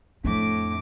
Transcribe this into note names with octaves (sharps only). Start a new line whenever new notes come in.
F2 A2 D4 D6